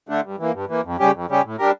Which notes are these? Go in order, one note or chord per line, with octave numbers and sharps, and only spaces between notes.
D3 A3 D4
G2
E3 A#3
G2
E3 A#3
F2
C#3 G3 C#4 G4
F2
C#3 G3 C#4 G4
A2
G3 D4 G4 A#4